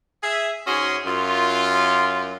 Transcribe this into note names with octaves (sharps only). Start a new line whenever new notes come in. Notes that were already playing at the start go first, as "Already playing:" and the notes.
G#4 E5
G#2 C#4 F#4 G#4 C6
F#2 F4